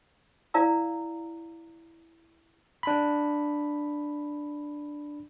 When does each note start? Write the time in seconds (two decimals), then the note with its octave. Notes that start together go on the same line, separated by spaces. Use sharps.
0.54 E4 D5 F5 A#5 E6
2.83 D4 B5